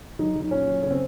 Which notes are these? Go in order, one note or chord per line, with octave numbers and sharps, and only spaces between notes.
F#3 D#4
F#3
D#4
A#2 C#4
F#3
C#3 C#4
C4